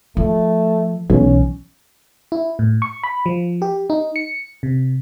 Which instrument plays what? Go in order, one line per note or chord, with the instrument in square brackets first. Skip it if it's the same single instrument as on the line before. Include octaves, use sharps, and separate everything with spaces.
[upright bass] F3 [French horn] A3
[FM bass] B1 [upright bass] E3 [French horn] C#4
[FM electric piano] E4
A2
C#6
B5
F3
G4
D#4
C#7
C3